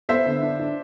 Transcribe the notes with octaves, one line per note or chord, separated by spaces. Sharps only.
B3 C5 E5
D3
D4
D4